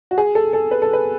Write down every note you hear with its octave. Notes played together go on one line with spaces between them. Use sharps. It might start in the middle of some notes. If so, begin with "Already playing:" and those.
F#4
G#4
A4
A4
B4
A4
B4